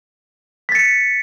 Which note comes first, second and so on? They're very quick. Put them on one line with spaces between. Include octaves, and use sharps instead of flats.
B6 A6 C#7